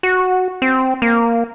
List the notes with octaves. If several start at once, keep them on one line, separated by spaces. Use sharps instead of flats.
F#4
C4
A#3